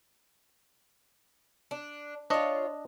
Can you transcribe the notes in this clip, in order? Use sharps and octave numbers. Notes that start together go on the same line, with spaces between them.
D4
D4 F4 C#5 D#5